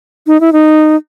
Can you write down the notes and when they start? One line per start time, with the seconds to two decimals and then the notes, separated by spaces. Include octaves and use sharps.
0.27 D#4
0.41 E4
0.53 D#4